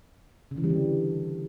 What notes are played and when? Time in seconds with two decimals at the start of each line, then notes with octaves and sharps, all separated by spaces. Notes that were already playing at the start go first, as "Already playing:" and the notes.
0.51 C#3
0.58 E3
0.64 G3
0.70 D3